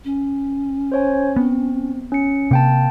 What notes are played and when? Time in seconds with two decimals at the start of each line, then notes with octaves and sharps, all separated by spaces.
0.04 C#4
0.92 C5 C#5 G#5
1.36 B3 C4
2.12 C#4 C#7
2.51 C3 A#3 G5 A5